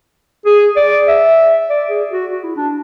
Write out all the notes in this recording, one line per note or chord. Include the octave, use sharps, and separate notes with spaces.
G#4
D5
E5
D5
G#4
F#4
F#4
E4
D4